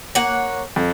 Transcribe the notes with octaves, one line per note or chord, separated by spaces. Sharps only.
A#3 C#5 F#5
F2